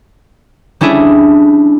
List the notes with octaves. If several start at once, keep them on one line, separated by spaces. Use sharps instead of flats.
G3 C#4 D4 E4 G#4